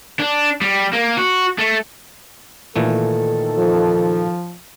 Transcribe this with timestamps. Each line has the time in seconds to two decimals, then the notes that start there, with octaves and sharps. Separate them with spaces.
0.20 D4
0.62 G3
0.93 A#3
1.17 F#4
1.58 A3
2.76 A#2 D#3 E3 A3 A4
3.59 F3